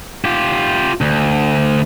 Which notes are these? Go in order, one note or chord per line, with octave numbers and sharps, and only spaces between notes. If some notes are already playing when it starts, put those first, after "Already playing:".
F4 G4
D2